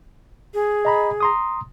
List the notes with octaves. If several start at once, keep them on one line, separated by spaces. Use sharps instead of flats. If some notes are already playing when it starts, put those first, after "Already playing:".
G#4
D#5 A#5 B5
A#5 C6 D#6